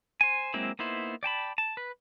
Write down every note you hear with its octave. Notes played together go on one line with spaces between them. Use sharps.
C5 G#5
F#3 G#3 A#3 C4 E4
A#3 B3 D#4 E4 C5
D5 G5 A5 B5
A5
B4